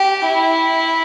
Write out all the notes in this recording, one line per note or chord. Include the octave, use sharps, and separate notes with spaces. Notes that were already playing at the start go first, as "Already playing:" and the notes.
Already playing: G4
E4